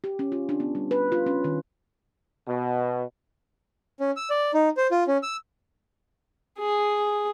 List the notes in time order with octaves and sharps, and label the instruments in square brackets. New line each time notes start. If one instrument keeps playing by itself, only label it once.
[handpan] G4
C#4
F4
D4
B3
G3
B4
F4
C#4
D#3
[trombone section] B2
[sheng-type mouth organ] C#4
E6
D5
D#4
C5
F4
C#4
E6
[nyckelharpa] G#4